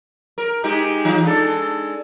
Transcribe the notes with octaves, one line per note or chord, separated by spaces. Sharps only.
A#4
G#3 D#4 G4
E3 D#4
G#3 D4 A4